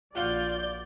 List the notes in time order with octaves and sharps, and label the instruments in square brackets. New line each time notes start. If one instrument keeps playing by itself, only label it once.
[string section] A#1 G6 [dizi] F4 [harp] F#4 F5 F#5 [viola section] D5